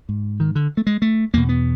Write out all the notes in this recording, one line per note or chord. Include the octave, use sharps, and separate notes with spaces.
G#2
D#3
D3
A3
G#3
A3
E2 B2 A#3
B3